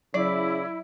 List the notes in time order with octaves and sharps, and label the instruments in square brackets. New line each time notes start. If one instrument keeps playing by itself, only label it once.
[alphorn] C#3 [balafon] F#3 [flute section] E4 [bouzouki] D5